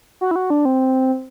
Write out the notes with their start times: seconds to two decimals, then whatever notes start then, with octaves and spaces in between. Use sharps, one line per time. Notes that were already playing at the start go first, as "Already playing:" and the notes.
0.21 F#4
0.31 E4
0.36 F#4
0.50 D4
0.65 C4